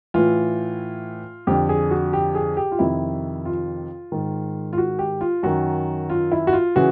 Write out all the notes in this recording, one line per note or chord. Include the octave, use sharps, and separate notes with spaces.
A2 E3 F4
F2 D3 G4
G#4
F#4
G4
G#4
G4
F4
F2 C3 D#3 E4
F4
G#2 D#3
F4
F#4
G4
F4
F#2 D#3 F#4
F4
E4
F#4
F4
C#3 E3 F#4